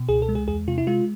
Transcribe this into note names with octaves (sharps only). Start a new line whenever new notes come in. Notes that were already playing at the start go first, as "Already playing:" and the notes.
Already playing: B2
C#2 G#4
A4
G#3
G#4
E2 G#4
C3 F4
E4
G#3 F4